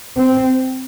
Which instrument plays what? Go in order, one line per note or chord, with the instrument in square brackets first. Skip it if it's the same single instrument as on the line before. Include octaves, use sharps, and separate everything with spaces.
[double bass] C4